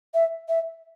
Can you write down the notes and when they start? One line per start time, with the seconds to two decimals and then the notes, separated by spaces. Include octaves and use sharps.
0.14 E5
0.49 E5